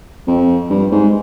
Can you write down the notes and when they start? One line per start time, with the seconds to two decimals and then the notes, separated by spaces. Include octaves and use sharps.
0.27 F2
0.70 G2
0.92 G#2